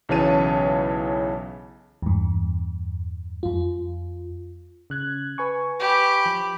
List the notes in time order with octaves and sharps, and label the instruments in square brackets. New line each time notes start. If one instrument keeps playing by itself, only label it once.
[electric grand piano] B1 C#3 E3 C#5 A5 D#7
[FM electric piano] E2 G2
F2 F4
C#3 F#6 G#6
B4 G#5 C#6
[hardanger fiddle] G4 B5
[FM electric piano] F3